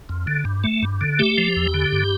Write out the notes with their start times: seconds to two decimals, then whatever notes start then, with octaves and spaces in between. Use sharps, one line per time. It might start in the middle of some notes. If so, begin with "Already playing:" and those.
0.09 F2
0.27 D3
0.45 G2
0.64 A3
0.83 G2
1.01 D3
1.19 A3 G4
1.38 F3
1.56 E2
1.74 D3
1.92 G2